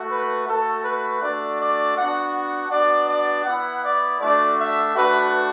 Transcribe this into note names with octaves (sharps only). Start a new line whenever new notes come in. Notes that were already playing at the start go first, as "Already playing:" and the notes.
Already playing: A3 F#4
B4
A3 F#4 A4
B4
A3 D4 F#4 D5
D5
B3 D4 F#4 F#5
F#5
B3 D4 F#4 D5
D5
B3 E4 F#5
D5
A3 D4 F#4 D5
E5
A3 D4 F#4 B4